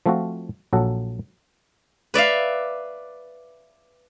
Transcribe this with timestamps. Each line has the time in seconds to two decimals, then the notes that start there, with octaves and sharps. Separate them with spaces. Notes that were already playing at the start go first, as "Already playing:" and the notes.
0.06 F3 A3 C4 F4 F#4
0.73 A#1 F#3 A4 F#5
2.14 B4 D5 E5 F5